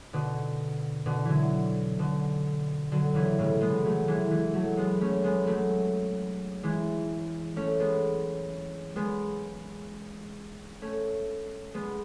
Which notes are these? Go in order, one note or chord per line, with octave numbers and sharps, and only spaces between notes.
B2 D3
B2 D3
D3 E3 F#3
B2 D3
D3 F#3
C#3 E3
A2 C#3
G#3 B3
F#3 A3
E3 G#3
E3 G#3
F#3 A3
G#3 B3
A3 C#4
G#3 B3
F#3 A3
E3 G#3
A3 C#4
G#3 B3
G#3 B3
A3 C#4
G#3 B3